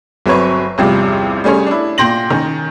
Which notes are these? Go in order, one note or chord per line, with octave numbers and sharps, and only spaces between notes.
G1 F#3 C4 B4 C#5 C#6
A1 E2 G2 C3 F3 G3
G3 A3 C#4 G#4 C#5
D4 E4
A#2 G5 C6 G6 A#6 F#7
D#3 C#4